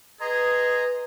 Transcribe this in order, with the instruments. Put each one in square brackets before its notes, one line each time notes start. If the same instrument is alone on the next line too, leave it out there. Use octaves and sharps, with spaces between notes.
[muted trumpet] G#4 [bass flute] B4 [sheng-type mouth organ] D#5 A#5 C6